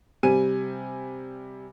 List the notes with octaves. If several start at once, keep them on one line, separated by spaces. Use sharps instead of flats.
C3 G3 G#5 D#7